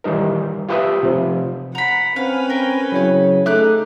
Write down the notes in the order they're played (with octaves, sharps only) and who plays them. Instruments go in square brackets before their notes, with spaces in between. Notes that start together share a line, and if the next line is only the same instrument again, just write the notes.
[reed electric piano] D#3 E3 G3 D#4 A#4
F4 G4 B4 E5 D#6 E6
C3 F3
[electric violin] F#5 [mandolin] A#5 B5
[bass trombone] C4 [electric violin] C#4 B4 [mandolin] F5
[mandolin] A#4 G5
[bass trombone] C#3 [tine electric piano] F#3 E4 C#5
[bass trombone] A3 [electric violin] D#4 [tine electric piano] G#4 A4 E5 [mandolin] D6 F#6